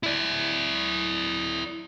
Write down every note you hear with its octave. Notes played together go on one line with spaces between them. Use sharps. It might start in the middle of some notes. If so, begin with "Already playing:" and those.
E4 D5